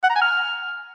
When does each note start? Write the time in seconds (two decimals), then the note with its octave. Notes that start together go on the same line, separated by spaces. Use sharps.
0.04 F#5
0.10 A#5
0.16 G#5
0.22 F6